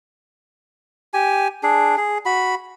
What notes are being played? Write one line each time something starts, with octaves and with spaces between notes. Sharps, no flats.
G4 G#5
D4 G#4
G#4
F#4 B5